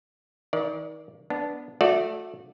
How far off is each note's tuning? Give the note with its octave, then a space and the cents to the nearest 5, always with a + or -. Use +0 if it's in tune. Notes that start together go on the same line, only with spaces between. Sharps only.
D#3 +35 D5 +0
B3 +0 D4 -10
A3 -5 F#4 -30 D5 +5